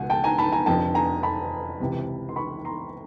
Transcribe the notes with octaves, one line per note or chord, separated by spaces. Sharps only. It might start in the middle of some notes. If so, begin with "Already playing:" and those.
Already playing: C#2 B2 F#5 G#5
G5 A5
G#5 A#5
A5 B5
G#5 A#5
F1 F2 D3 G5 A5
G#5 A#5
A5 B5
C#2 C3 E3
C6
B5 C#6
A#5 C6